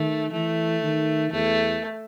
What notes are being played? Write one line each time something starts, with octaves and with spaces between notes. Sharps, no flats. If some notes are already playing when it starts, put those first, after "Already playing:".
Already playing: D#3 A3
E3 A3
D#3
E2 A3